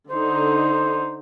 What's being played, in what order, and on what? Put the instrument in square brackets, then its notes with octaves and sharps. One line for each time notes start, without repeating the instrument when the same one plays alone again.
[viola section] D3 D#4 [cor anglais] C5